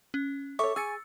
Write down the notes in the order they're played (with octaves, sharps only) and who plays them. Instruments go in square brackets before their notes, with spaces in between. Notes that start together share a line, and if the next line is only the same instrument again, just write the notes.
[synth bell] C#4
[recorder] A4 [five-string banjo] C#5 E5 [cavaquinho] C#6 [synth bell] D6
[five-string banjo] G#4 [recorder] G#5 [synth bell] E6 A6 C#7